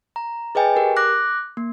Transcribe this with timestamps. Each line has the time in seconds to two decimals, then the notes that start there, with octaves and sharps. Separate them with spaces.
0.16 A#5
0.55 G#4 B4 D#5 G5 G#5
0.76 G4 A#4
0.96 D6 F#6 A#6
1.57 A#3